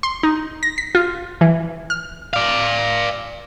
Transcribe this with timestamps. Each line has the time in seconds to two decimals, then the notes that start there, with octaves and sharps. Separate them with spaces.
0.03 C6
0.23 D#4
0.63 A#6
0.78 B6
0.95 F4
1.41 E3
1.90 F6
2.33 D5 F5